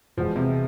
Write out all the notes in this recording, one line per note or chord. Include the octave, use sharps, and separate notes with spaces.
E1 E2 B2 F3 G#3
C3